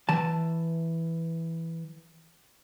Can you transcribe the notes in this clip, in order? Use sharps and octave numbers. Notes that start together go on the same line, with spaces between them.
E3 A5